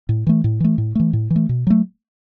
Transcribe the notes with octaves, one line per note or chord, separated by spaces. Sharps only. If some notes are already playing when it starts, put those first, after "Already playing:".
A2
E3 A3
A2
E3 A3
A2
E3 A3
A2
E3
A3
B2
F#3 A3